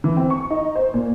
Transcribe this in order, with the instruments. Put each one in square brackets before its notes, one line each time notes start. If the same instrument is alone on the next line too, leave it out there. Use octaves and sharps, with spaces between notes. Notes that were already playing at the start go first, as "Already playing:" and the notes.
[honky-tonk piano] E3
C4
C#6
D#4
C5
A#2